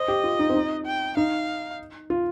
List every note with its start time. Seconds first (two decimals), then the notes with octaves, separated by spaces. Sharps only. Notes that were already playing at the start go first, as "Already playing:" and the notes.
Already playing: C5 D#5
0.08 G4
0.24 F4
0.39 D#4
0.50 C4
0.55 D#4
0.86 G5
1.17 D#4 F5
2.10 F4